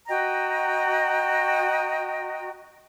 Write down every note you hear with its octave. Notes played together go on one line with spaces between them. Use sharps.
F#4 D#5 G5 A#5